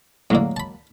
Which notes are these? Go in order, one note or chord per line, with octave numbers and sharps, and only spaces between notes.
A2 D3 F#3 G#3 A#3
A5 B5